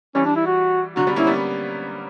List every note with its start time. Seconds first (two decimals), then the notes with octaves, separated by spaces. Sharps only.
0.15 E3 G3 C#4
0.25 D4
0.36 E4
0.46 F#4
0.96 D3 F#3 F#4
1.07 G3 B3
1.16 A#3 C#4 E4
1.27 G3 B3